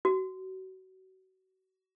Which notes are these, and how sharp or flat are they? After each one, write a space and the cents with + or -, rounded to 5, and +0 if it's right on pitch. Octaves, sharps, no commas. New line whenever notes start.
F#4 +30